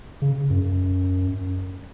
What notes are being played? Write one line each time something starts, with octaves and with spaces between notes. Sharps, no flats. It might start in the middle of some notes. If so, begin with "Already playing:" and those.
C#3
F#2